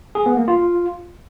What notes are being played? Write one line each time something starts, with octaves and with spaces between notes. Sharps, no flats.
G#4
B3
A#3
F4